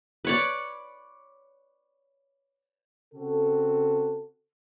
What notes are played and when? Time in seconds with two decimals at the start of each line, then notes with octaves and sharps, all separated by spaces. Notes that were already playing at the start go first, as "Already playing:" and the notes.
0.25 B4 C#5 D5
3.14 C#3 C4 F#4 A4